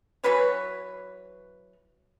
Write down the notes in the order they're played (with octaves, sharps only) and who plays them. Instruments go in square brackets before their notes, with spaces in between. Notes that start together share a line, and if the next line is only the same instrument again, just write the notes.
[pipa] E3 F#3 B4 C#5